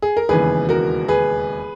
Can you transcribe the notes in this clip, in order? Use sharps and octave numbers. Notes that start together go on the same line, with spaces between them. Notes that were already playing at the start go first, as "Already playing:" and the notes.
G#4
A#4
E1 D#2 C#3 E3 G#4 B4
F#4 A#4
G#4 B4